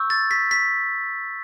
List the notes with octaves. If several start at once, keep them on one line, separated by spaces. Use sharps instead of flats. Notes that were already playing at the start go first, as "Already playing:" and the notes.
Already playing: C#6 E6 G6
A6
B6
B6